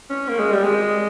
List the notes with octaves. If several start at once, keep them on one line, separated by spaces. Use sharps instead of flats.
C#4
A#3
G#3
G3
G#3